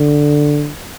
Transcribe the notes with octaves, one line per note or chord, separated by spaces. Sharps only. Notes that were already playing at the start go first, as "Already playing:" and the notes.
Already playing: D3